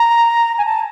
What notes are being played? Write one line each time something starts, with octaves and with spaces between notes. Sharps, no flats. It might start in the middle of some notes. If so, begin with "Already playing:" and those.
Already playing: A#5
G#5
A5